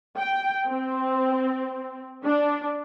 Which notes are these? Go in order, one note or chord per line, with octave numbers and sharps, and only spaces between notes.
G5
C4
D4